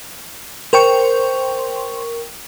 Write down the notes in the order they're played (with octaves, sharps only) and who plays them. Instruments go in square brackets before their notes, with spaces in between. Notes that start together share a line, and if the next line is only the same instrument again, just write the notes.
[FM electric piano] A#4 G5 C#6 [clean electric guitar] C5